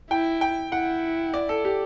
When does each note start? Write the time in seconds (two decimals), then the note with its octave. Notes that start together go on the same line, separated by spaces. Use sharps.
0.11 E4 G5
0.41 G5
0.72 E4 F#5
1.34 D5
1.49 A4
1.65 G4